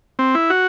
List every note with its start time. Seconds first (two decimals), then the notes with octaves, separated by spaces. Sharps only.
0.19 C4
0.35 E4
0.50 F#4